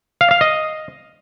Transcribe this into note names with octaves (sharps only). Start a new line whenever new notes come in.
F5
F5
D#5